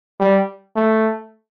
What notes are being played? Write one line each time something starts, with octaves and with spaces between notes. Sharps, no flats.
G3
A3